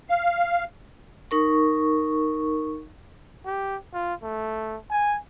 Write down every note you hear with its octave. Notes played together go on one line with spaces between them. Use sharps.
F5
D#4 A#4 C#6
G4
F4
A3
G#5